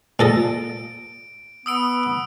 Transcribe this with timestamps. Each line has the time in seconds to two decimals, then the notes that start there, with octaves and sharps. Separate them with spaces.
0.19 A#2 A4 D#5 D7
1.66 B3 D#6 E6 D7